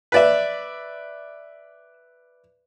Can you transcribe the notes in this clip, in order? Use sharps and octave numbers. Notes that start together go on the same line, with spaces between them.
B4 D5 E5